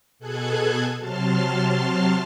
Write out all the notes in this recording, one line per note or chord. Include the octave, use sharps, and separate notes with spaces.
B2 G#4 A4 F#6 G#6
C3 F#3 A5 C6 F6